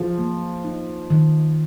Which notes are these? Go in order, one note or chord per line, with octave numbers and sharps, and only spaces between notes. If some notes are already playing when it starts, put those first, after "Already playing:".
Already playing: F3 G#4
A#3
D#4
D#3